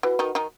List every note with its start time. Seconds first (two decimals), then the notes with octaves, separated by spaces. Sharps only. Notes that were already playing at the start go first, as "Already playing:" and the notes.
0.03 E3 F#4 B4 F#5
0.19 D#3 D#4
0.35 D#3 D#4